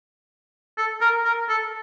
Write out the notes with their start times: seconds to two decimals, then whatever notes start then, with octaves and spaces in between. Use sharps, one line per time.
0.78 A4
1.01 A#4
1.25 A#4
1.49 A4